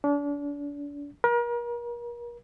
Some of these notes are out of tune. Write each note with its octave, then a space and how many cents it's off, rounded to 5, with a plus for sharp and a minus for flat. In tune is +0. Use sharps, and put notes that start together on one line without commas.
D4 -35
A#4 +35